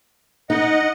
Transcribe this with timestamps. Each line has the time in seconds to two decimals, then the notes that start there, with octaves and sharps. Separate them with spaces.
0.50 D#4 D#5 F#5